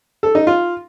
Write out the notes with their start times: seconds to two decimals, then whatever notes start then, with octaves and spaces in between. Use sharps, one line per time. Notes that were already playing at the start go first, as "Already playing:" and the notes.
0.23 A4
0.35 D#4
0.47 F4